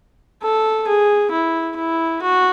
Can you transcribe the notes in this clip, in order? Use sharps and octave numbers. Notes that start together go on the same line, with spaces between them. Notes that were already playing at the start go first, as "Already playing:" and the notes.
A4
G#4
E4
E4
F#4